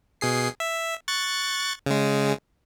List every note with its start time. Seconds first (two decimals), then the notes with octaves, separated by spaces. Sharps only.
0.21 B2 G#4 C7
0.60 E5
1.08 C#6 F#6 A6
1.86 C#3 G#3